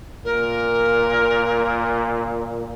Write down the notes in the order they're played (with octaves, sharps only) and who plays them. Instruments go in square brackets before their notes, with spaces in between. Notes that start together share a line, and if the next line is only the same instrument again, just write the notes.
[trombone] A#2 [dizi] A#4